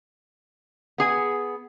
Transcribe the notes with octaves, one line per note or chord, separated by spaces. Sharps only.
B3 G#4 G#5